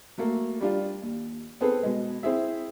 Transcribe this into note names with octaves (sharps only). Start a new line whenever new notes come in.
F#3 A3 A#3
G3 D4 F4
D#2
B3 C4 G#4 A4 B4
B2 G#3
C4 E4 G#4 E5